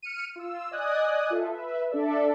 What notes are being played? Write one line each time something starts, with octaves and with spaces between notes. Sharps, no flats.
F6 C#7 D#7
F4 E6
D5 D#5 G#5 D#6 F#6
F4 A4 E5
B4 E5
D4 A4 D5 E5